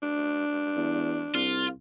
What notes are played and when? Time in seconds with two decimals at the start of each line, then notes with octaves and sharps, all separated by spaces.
0.03 D4
0.77 E2
1.34 C2 F4